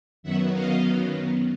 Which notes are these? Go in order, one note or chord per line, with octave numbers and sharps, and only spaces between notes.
F#2 D#3 F#3 B3 E5 F#5
D#5 F5